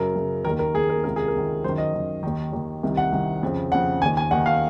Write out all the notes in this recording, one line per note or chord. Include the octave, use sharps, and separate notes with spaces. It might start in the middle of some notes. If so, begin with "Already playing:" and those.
Already playing: F#2 C#3 A#4
F#2 C#3
D#3 A#4
D#2
A#4
D#2 D#3 G#4
A#4
C#2 C3 D#3 A#4
G#4
A#4
C#2 C3 D#3
F#2 D#3 C5
D#5
F#2 D#3
D#2 D#3
D#2 D#3
C2 C3 D#3
F#5
C2 C3 D#3
F2 C#3
F2 C#3 F#5
D#2 D#3 G#5
G#5
D#2 D#3 F#5
F5